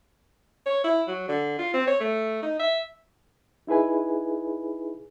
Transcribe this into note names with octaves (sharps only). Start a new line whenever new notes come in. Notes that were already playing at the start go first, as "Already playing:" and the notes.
C#5
E4
F#3
D3
F4
C4
C#5
A3
D#4
E5
D#4 E4 G#4 B4 G#5